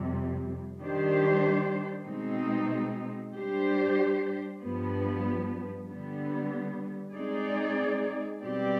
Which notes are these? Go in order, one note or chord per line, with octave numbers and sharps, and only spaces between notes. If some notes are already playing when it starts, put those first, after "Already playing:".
Already playing: F2 C3 G3
D#3 G3 D4 G4 C5
B2 G#3 C4 D#4
G3 D4 G4 C5
G2 F3 B3
D3 G3 B3
G#3 C4 D#4 G#4 D5
B2 G3 C4 G4 D5